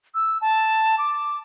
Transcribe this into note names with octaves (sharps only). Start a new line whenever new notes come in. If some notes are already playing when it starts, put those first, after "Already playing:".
E6
A5
D6